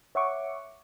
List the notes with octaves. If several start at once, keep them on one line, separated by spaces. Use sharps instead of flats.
C#5 E5 F#5 C#6 D6